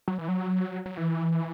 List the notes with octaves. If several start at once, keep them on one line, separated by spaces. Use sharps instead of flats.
F#3
E3
F#3
F#3
E3